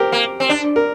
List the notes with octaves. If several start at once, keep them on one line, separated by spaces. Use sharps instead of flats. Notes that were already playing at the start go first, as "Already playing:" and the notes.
Already playing: G4 A#4 C5
A#3
C4
D4
A#4